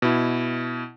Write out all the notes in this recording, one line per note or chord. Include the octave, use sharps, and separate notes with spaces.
B2 E4